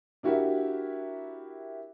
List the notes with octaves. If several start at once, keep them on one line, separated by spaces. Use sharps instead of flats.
D4 E4 F#4 G4 A#4 E5